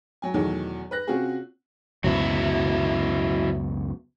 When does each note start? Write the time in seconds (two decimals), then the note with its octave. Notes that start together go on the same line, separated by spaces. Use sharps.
0.22 F#3 G#5
0.34 E2 B2 D#3 E3 F#3 A3
0.91 B4 F#6 A#6
1.07 C3 C4 C#4 F4 F#4 G#4
2.04 C#2 F#2 B2 F#3 E4